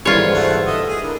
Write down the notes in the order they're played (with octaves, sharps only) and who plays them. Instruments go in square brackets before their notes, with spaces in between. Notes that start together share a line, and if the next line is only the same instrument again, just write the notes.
[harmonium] G#2 D3 C5 [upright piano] E3 G3 [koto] F4 C#5
[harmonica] A3 F#5
[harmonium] A3 [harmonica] D#5 E5
[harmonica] G#4
[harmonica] D3 [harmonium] E4 A#4